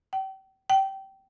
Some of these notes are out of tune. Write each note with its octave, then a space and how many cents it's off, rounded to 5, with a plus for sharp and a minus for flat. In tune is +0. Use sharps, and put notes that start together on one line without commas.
G5 -35
G5 -20